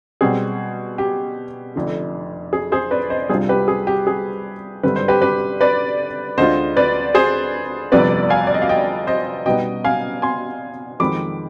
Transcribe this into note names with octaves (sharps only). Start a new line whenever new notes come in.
B2 G3 C4 G#4
G4
F1 F2 D3
G#4
G#4 C5
B4 D5
C5 D#5
C2 C3 G3 D4 F4 G#4 C5
G4 B4
G#4
G4
G#4
G#1 G2 D3 G3 C4 B4
C5
G4 B4
G4 B4
B4 D5
D2 D3 G#3 D4 F4 C5 D#5
B4 D5
G#4 C5
G1 F2 C3 G3 B3 B4 D5
F5 G#5
D5
D#5
F5
D#5 G5
C5 D#5
B2 G3 B3 D#4 D#5 G5
F5 G#5
G#5 C6
F2 D#3 G#3 C4 B5 D6